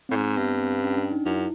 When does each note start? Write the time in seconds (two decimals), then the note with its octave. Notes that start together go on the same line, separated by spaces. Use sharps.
0.09 A2 C4
0.16 G#2
0.23 C4
0.37 G2 B3
0.60 C4
0.82 C#4
0.97 D4
1.12 D#4
1.26 F#2 E4